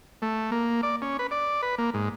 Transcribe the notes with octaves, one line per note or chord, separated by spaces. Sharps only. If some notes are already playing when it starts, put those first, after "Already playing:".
A3
A#3
D5
C#4
B4
D5
B4
A#3
G#2